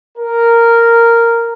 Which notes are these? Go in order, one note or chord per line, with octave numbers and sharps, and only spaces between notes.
A#4